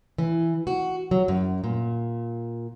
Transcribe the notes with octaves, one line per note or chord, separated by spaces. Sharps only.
E3
F#4
F#3
F#2
A#2